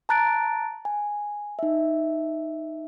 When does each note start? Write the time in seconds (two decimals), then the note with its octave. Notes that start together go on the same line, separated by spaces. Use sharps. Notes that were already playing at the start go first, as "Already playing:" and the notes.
0.09 A5 A#5 F#6 A6 D7
0.85 G#5
1.59 D#4 E5